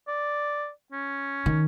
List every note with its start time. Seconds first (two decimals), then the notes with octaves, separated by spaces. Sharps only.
0.08 D5
0.92 C#4
1.46 D#3